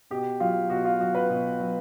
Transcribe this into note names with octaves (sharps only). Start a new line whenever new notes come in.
B2 G4
F#3 F4
B2 F#4
F4
F#3 F#4
B4
B2
F#3